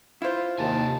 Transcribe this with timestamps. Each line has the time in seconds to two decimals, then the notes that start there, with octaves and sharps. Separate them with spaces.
0.22 E4 F4 C5
0.59 D#2 C3 G#5 A5